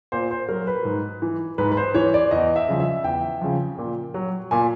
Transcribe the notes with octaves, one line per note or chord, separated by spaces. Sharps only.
A#2 C5
C5
F#3 A#4
B4
G#2
E3
G#2 B4
B4
C5
E3 C#5
D5
E2 D#5
E5
C#3 F3
E5
E2 G5
C#3 F3
A#2
F#3
A#2 G#5